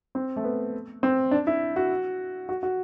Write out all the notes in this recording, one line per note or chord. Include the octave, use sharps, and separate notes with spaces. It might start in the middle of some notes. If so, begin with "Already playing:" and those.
C4
A3
B3
C4
D4
E4
F#4
F#4
F#4